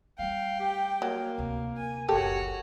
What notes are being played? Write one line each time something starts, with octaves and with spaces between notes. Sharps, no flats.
G3 A3 F5 G5
G4
F#3 A#3
D2 C3
G#5
F#1 D2 F#4 G4 A4 A#4 C#5